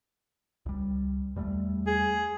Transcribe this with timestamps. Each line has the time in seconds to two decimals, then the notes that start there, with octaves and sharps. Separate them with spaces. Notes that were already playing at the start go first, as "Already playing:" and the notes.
0.66 C#2 G3
1.36 E2 G3 A3
1.87 G#4